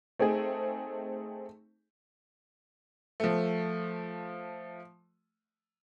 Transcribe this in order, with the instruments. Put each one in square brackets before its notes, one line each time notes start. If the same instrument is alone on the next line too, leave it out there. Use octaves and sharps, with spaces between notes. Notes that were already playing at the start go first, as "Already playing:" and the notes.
[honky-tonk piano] A3 C4 D#4 G#4
[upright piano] F3 A3